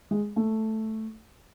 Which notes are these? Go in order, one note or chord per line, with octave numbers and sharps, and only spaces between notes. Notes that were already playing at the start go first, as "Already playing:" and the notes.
G#3
A3